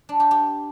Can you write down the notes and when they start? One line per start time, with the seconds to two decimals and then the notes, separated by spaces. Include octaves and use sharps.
0.09 D4
0.20 G4
0.31 G4